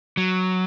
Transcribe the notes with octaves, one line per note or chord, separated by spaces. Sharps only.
F#3